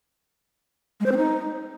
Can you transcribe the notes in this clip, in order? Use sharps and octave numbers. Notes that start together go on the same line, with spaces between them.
G#3
C5
C4
D#4